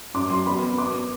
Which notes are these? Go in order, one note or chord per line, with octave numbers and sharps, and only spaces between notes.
F#2 D6
F#3 C6
B3 B5
B3
B3 D6